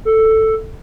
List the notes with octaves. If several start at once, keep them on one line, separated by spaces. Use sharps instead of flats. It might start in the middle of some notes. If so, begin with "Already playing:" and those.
A4